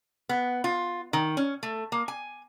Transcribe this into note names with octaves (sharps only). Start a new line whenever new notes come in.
B3
F4
D#3
C#4
A3
A#3
G#5